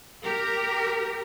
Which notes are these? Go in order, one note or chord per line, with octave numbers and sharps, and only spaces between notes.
G4 A#4